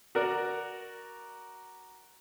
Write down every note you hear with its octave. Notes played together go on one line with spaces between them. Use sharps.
F#4 A#4 D5